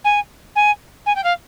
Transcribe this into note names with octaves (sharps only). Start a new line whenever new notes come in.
G#5
G#5
G#5
G5
F5